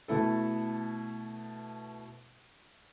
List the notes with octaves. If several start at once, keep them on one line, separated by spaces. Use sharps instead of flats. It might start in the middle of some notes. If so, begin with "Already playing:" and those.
B2 A3 E4 A4